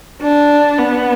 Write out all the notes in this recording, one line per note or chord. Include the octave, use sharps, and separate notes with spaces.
D4
B3